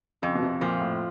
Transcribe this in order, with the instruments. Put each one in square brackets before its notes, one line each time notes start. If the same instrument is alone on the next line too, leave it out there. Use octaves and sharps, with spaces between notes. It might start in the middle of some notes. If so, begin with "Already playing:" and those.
[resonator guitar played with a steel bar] F2 [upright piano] C#3
[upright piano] B2
C3
[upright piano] A#2 [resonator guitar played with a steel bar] F3
[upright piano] A2